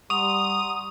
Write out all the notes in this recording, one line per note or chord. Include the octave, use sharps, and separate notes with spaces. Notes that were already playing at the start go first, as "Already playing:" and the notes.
G3 F#5 A#5 C6 C#6 D#6 F7